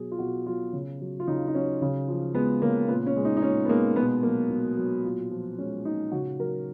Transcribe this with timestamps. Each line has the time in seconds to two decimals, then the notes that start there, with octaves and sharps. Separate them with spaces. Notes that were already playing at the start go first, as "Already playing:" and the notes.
Already playing: B2 F#3 G#4
0.12 F4
0.19 B2 F#4
0.46 F#3 F4
0.73 C#3
1.00 F#3
1.20 F4
1.27 C#3 D#4
1.48 D#4
1.55 F#3 C#4
1.82 C#3
2.08 F3
2.35 G#3 B3
2.62 C#3 A#3
2.88 A#2 B3
3.07 C#4
3.16 G#3
3.25 D#4
3.37 D#4
3.42 A#2 C#4
3.65 B3
3.69 G#3 A#3
3.96 B2 B3
4.23 F#3 A#3
4.50 B2
4.77 F#3
5.05 A#2
5.31 F3
5.58 G#3 C#4
5.85 A#2 D#4
6.12 C#3 F#4
6.39 F#3 A#4